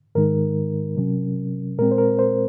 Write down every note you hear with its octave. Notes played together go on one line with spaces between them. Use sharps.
G#2 D#3 G#3 D#4 A#4
C3 F#3 C#4
A#2 G#3 C4 A#4
C5
A#4
C5